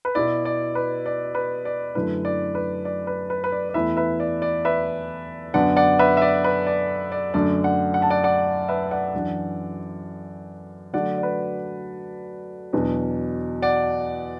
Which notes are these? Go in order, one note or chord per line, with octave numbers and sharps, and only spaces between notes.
B4
B2 B3 E4 D5
D5
B4
D5
B4
D5
F#2 D3 A3 E4 B4
D5
B4
D5
B4
B4
B4
D5
D5
E2 E3 A3 E4 B4 E5
B4 E5
D5
D5
B4 E5
F#2 D3 B3 D4 D5 F#5
D5 F#5
B4 E5
E5
D5
B4
D5
D5
F#2 D3 A3 D4 D5
D5 F#5
F#5
A5
D5 F#5
D5 F#5
B4 E5
D5 F#5
F#2 E3 D4
D3 F#3 A3 D5 F#5
D5
B4
E2 B2 F#3 D4
D5 F#5